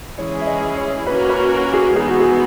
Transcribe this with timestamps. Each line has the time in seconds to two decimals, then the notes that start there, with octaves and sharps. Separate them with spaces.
0.17 E3 G#3 C#4 E4 G#4 C#5
0.41 E5
0.47 D#5
0.77 C#5
1.03 C#5
1.07 A#3 C#4 F#4 A#4 B4
1.29 B4
1.74 G#4
1.96 E3 G#3 B3 D#4 G#4
2.08 F#4
2.20 G#4